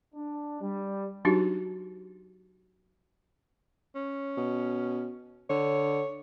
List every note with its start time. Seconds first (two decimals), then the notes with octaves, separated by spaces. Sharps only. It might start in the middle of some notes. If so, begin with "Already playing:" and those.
0.15 D4
0.61 G3
1.25 F#3 D4 D#4 F#4 G4
3.95 C#4
4.37 B2
5.50 D3 C#5